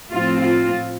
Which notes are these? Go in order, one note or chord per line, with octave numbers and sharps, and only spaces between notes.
A2 F3 C4 F4
F4